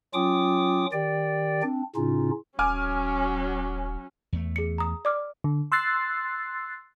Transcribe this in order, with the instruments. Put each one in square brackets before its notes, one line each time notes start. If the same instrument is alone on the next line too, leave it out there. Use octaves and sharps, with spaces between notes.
[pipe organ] F#3 C#4 F4 G5 D6 D#6
D#3 G4 D5 G5
C4 D4
A2 C#3 C#4 D#4 F4
[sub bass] D#1 [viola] F#3 C#4 [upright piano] G#5 D6 F6
[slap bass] E2 A3
[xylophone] G#4 C#7
A#5 D#6
D5 D6 F6
[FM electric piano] D3
C6 E6 F#6 A6 C7